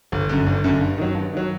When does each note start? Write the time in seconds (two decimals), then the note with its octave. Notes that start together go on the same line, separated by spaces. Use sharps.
0.12 G1
0.29 F#2 D3
0.47 G1
0.64 F#2 D3
0.81 G2
0.98 D#3 F#3
1.15 G2
1.33 D#3 F#3